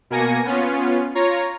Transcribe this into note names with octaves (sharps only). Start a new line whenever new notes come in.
B2 A#3 G#5 A#6 C#7
B3 C#4 F4
F4 C#5 A#5